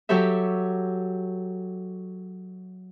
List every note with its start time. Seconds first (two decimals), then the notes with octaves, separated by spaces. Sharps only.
0.09 F#3 G4 A4 C#5 E5